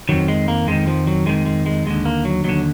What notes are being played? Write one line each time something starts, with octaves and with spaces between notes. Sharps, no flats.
F2 D#3 F#3
G#3
A#3
F2 D#3 G#3
F3
F#3
F2 D#3 G#3
G#3
G#3
D#2 D3 G#3
A#3
F#3
D#2 D3 F#3